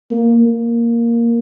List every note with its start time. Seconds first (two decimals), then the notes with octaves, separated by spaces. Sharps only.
0.11 A#3
0.46 A#3